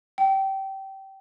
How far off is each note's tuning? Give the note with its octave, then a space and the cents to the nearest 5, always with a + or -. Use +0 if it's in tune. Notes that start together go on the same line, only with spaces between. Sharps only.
G5 -20